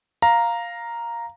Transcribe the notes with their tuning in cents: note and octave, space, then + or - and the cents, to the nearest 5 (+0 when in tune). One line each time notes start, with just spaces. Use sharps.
F5 +0 A#5 +0